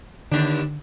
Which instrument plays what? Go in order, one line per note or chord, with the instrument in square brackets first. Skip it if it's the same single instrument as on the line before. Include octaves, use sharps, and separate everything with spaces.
[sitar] D#2 D4 [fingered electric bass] D3